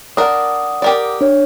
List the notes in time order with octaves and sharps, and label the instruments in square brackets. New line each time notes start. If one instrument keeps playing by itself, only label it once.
[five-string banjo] D4 A#4 [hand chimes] F#5 D#6
[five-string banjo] G4 A#4 D5
[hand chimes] D4 C#5